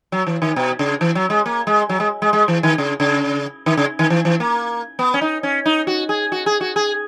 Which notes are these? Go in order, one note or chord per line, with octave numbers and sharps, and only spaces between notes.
F#3
E3
D#3
B2
C#3
E3
F#3
G#3
A#3
G#3
F#3
G#3
G#3
G#3
E3
D#3
C#3
C#3
D#3
C#3
D#3
E3
E3
A#3
B3
C#4
D#4
C#4
D#4
F#4
G#4
F#4
G#4
F#4
G#4